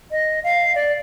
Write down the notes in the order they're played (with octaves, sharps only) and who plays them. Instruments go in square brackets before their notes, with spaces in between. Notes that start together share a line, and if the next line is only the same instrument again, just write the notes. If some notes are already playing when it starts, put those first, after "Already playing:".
[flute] D#5
F5
D5